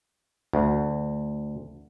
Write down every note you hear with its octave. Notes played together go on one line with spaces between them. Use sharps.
D2